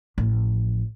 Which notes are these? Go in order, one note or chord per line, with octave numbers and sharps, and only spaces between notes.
A1 F3